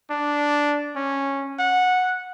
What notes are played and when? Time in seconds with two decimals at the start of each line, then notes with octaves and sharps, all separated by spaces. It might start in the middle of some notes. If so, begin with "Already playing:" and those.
0.11 D4
0.96 C#4
1.59 F#5